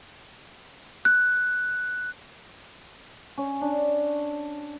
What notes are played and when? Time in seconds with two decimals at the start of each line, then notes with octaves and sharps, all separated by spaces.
1.05 F#6
3.38 C#4
3.61 D4